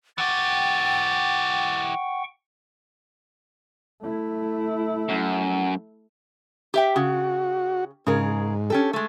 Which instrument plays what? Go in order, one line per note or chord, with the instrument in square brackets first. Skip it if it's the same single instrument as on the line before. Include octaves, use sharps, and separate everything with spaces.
[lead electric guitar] E3 G4 [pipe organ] F#5 G5 C#6 [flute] A6
[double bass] A3 E4
[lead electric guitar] F#2
[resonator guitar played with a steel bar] G4 E5 G5
[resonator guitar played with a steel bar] C#3 [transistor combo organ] F#4
[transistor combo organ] G#2 [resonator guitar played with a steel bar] C#3 G#4 A#4
[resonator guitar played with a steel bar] C#4 G4 A4
G#3 A3